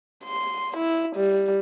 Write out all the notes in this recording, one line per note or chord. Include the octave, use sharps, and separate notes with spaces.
C6
E4
G3